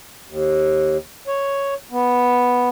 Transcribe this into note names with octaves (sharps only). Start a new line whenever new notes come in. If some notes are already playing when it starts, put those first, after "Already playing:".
D#2
C#5
B3